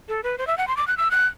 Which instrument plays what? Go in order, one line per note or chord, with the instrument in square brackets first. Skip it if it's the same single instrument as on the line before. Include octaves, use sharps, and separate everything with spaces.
[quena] A4
B4
C5
E5
F#5
C6
D6
F#6
E6
F#6